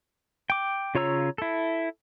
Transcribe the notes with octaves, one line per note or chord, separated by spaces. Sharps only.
G5 D6
C#3 F4 C#5 A#5 E6
E4 A4